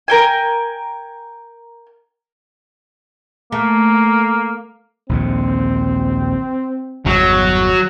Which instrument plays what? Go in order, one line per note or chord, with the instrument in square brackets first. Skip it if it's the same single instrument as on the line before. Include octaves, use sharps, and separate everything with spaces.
[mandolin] A#4 G5 G#5
[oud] A3 [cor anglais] A#3
[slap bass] A#1 D#2 D3 [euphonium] C4
[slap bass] G1 E2 B2 [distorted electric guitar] F#3